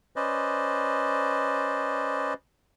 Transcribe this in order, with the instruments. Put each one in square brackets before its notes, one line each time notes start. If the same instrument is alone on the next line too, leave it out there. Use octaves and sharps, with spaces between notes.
[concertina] C#4 B4 C5 D5 D#5